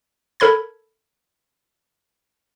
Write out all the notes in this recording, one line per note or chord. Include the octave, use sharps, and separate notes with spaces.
A4 A#4 B5 G#6